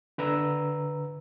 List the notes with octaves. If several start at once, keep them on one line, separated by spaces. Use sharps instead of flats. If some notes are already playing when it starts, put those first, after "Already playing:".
D3 B4 A#5 E6